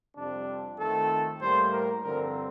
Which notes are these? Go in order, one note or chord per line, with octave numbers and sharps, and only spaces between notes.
F2 C3 G3 C4 D4
F2 D#3 A3 C4 A4
A2 G3 A#3 C5
A#4
G2 D3 F3 C4 A#4